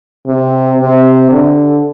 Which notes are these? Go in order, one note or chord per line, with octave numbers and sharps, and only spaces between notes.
C3
C3
D3